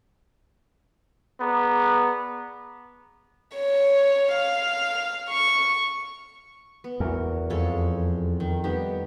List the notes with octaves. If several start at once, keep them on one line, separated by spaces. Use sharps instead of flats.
B3 G#4 D5 A#5
C#5
F5
C#6
B3
E2 F#4 A#4
F2 G#3 A4 C#5
D#3
G3 B3 D#4 G4